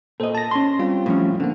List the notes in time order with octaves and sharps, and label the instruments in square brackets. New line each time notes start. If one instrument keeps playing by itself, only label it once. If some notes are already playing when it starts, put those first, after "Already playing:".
[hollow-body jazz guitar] A#2 D#5 [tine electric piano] A4 C5
[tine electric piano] A5 A#6
[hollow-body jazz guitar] C#4 C6
[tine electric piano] G3 C4 F4
[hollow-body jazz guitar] A2 F3 C#4
[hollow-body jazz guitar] D3 [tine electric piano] A#3 C4